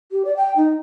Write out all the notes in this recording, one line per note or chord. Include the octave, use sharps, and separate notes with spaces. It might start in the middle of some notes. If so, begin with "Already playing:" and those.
G4
D5
G5
D#4